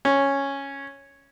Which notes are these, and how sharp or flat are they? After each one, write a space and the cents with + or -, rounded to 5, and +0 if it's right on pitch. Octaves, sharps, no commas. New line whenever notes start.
C#4 -5